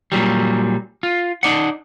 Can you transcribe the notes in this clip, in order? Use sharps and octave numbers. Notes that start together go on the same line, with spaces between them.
A#2 F#3 G3
F4
D#4 D5 F#5